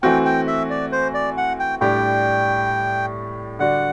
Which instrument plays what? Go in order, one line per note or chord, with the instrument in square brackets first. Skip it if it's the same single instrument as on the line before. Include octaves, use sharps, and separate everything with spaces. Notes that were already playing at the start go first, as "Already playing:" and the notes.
[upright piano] E3 A3 C4 F#4 [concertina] G5
[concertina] G5
E5
D5
C5
D5
F#5
G5
[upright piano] A2 G3 D4 G4 [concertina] G5
[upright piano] D3 G3 D4 F#4 [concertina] F#5